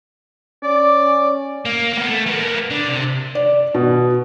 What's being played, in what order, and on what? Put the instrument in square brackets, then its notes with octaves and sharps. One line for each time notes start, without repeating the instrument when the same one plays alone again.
[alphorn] C#4 [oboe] D5
[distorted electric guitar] A#3
A#3 B3
A3
A#3 B3
D3
C3
[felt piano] D5
B2